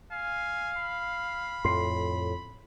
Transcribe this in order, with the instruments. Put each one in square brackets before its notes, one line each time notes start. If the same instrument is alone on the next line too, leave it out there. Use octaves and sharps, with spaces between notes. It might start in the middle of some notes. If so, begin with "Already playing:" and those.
[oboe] F5 [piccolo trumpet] G#5
[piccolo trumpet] B5
[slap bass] F2 A2 [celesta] C6 C7